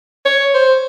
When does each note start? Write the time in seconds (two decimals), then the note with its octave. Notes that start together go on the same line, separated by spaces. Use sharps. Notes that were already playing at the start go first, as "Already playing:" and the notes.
0.26 C#5
0.54 C5